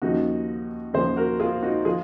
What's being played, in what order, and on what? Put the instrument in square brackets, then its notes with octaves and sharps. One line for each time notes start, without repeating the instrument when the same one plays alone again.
[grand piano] D#2 C#3 F3 D#4 F#4
D#2 C#3 F3 G#4 C5
F#4 A#4
F4 G#4
D#4 F#4
F3 F4 G#4